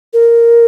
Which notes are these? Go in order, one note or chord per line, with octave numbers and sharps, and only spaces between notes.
A#4